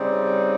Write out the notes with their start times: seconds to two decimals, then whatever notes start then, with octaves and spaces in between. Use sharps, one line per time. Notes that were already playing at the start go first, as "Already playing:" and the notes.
Already playing: C#3 G3 C4 D#4